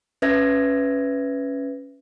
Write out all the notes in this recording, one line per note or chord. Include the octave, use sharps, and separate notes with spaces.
C#4 B4 E5 G#6 A#6